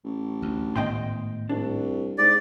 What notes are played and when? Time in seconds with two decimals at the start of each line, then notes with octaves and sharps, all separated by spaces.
0.04 A1
0.42 D2
0.76 G#1 A2 B3 D#5 G5 C6
1.49 C2 D4
2.18 G#2 D5